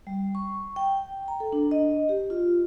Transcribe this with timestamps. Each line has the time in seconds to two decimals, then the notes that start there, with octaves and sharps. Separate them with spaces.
0.07 G3
0.35 C#6
0.76 G5
1.28 A#5
1.40 A4
1.53 D4
1.71 D#5
2.09 G4
2.30 F4